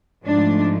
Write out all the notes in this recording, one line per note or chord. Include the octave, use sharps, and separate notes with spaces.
G#2 F3 A3 D4